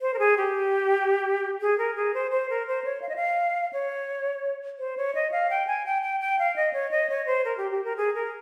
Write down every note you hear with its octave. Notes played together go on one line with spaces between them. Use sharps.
C5
A#4
G#4
G4
G#4
A#4
G#4
C5
C5
A#4
C5
C#5
F5
D#5
F5
C#5
C5
C#5
D#5
F5
G5
G#5
G5
G5
G5
F5
D#5
C#5
D#5
C#5
C5
A#4
G4
G4
A#4
G#4
A#4